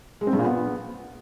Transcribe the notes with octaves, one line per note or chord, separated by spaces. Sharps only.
G#3
C4
G2
A#2
B3